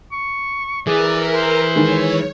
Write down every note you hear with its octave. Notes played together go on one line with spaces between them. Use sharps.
C#6
E3 G#4 A#4 D5
C5
D#3 G#3 C#5